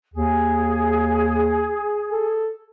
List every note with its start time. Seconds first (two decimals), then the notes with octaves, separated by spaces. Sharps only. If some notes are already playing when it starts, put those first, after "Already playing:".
0.14 D#2 G#4
2.12 A4